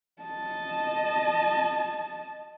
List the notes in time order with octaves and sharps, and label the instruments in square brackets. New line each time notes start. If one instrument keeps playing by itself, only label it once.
[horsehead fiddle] D#5 A5